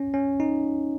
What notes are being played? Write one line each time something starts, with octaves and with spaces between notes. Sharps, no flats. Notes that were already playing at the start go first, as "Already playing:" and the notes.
Already playing: C#4
C#4
D#4